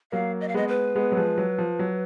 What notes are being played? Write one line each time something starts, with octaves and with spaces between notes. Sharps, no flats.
F#3 A#3 F5
D#5
F5
G#3 B3 D#5
B4
G#3 B3
F#3
F3 G#3
F#3
F3
F#3